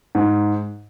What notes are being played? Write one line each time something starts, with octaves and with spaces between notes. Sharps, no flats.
G#2